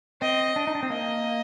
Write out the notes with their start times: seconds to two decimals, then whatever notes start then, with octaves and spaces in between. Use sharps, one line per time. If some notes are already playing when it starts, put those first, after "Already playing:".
0.22 C4 D#5
0.56 D4
0.67 D#4
0.75 D4
0.83 C4
0.90 A#3 D#5